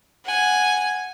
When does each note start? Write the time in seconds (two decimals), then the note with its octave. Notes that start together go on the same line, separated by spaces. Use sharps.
0.25 F#5 G#5